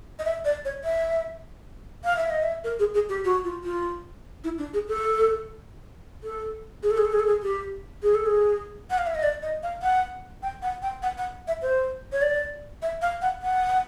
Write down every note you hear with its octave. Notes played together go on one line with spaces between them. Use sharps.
D#5
E5
D5
C#5
E5
F5
E5
D#5
E5
A#4
G#4
G#4
G4
F#4
F4
F4
E4
D4
G#4
A4
A4
G#4
A4
G#4
A4
G#4
A4
G#4
G4
G#4
A4
G#4
F#5
F5
E5
D#5
D5
D#5
F5
F#5
G5
F#5
G5
F#5
F#5
E5
C5
C#5
D5
E5
F5
F#5
F#5